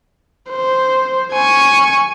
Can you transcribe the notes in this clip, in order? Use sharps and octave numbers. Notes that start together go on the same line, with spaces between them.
C5
G#5 C#6